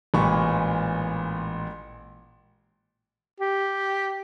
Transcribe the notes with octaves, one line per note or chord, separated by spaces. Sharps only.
A1 A#2 G#3 B5 C#6
G4